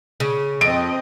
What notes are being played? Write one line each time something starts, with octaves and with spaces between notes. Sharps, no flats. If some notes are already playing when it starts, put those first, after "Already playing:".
C#3
F2 C4 D#5 D7